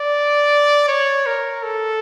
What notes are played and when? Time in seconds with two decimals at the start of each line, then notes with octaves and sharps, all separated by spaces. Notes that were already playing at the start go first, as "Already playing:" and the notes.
Already playing: D5
0.88 C#5
1.27 A#4
1.63 A4